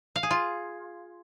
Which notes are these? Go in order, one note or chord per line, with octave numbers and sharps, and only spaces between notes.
F5
G#4
F4